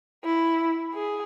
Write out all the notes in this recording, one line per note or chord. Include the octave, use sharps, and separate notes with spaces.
E4
G#4